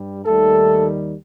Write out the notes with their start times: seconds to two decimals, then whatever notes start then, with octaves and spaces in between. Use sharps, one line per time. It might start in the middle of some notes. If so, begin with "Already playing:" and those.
Already playing: G2 G3
0.26 D#2 D#3 G3 A3 A4